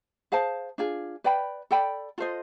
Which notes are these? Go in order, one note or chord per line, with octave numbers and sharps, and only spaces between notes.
G#4 C5 F5 A5
D4 F4 G#4
B4 D5 G5 B5
A4 D5 G5 B5
F4 A4 C5 D#5